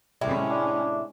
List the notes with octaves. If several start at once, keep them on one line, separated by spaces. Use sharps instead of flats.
A2 C3 G3 G#3 C#4 E4
D4